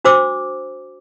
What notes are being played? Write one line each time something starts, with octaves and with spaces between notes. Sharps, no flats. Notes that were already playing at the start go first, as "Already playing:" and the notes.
D4 F#4 C5 D6 E6